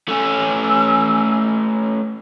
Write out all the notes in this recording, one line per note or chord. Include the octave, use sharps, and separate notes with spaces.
A3 C#4 G#5 E6